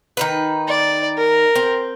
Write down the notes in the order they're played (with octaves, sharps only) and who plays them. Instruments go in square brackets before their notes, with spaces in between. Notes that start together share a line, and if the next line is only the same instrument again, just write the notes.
[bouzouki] D#3 D#4 B4
[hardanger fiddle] D5
A#4
[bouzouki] C4